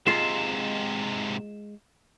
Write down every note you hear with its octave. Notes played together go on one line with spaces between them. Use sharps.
G#2 C3 G#3 F4 E7